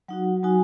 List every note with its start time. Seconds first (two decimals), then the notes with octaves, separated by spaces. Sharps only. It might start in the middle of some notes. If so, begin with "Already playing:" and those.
0.08 F#3 D#4 F#4 F#5
0.43 F#3 D#4 F#4 G#5